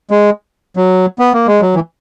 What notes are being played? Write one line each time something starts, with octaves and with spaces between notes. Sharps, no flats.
G#3
F#3
B3
A#3
G#3
F#3
E3